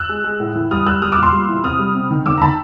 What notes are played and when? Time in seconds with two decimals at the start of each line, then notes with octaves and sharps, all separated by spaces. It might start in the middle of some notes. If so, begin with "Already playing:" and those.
Already playing: E6 F#6
0.09 G#3
0.24 G#3
0.40 A2
0.55 E3
0.71 G3 D#6 F6
0.86 G3 E6 F#6
1.02 G3 D#6 F6
1.12 D6 E6
1.17 A#2
1.23 C6 D6
1.33 G3
1.49 E3
1.63 C3 D#6 F6
1.79 G3
1.95 C3
2.11 D#3
2.26 D#3 D6 E6
2.38 A#5
2.41 D#3 A5 B5